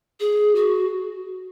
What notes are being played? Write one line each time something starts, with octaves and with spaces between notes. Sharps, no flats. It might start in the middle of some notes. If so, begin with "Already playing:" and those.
G#4
F#4